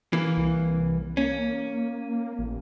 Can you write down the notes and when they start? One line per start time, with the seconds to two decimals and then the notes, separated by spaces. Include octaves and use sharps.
0.13 E3 A#3
0.38 C2
1.17 A#3 C#4
2.39 A1